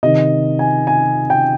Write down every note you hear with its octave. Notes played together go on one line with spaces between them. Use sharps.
C3 D#3 D#5
G#5
G#5
G5